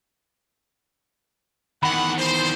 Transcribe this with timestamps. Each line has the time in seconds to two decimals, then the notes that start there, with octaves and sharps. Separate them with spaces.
1.83 E2 D#3 F#5 B5
2.17 C5